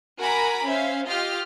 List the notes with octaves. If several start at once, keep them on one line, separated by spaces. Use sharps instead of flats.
F#4 A#4 G#5 A#5 B5 D6
C#4 C5 E5 F5
F4 G4 D#5 F5 F6